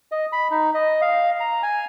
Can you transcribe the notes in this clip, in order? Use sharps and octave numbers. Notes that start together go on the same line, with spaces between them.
D#5
B5
D#4
D#5
F5
A#5
G#5